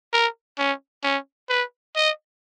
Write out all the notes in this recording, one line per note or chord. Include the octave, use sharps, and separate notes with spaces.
A#4
C#4
C#4
B4
D#5